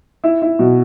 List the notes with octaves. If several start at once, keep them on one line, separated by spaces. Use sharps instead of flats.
E4
E4
B2